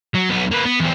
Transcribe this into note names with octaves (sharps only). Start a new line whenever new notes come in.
F#3
B1 B3
A#3 B4
B3
E2 C4